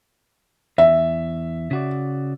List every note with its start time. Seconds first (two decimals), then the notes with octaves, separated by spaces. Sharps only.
0.78 E2 E5
1.71 C#3 F#4 D5